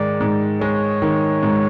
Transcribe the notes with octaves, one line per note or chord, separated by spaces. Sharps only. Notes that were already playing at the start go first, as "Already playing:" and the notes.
Already playing: G#2 D#3 G#3 D5
G#2
G#3 C#5
D#3
G#2